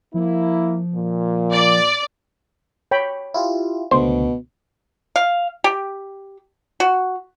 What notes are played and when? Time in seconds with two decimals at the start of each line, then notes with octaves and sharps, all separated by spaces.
0.14 F3 A#3 E4
0.94 A#2
1.52 D5
2.91 C#5 G5 B5
3.34 E4 F4 G4
3.91 C#2 B2 D3 A3 C5
5.16 F5
5.64 G4
6.80 F#4